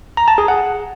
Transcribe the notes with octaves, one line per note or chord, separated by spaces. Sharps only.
A#5
A5
G#4
F#5